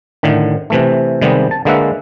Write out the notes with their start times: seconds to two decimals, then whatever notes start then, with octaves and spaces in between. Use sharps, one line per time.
0.23 A2 D3 D#3
0.70 C3 E3 A3
1.21 C3 D#3 G3 G#3 B3
1.51 A5
1.65 D3 G#3 A#3 B4 E5 F#5